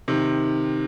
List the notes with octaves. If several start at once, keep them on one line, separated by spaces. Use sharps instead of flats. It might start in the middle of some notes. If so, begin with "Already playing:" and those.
C3 D#3